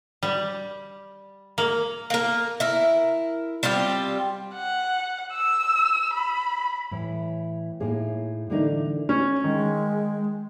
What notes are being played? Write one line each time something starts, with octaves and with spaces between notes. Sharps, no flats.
G3
A#3
A#3 A#4
E4 A#4
G3 C4 F4 G4
F#5
E6
B5
A2 E3
A2 A#3 D#4 G#4
D3 E3 A3 D4 D#4 A#4
C#4
D#3 G#3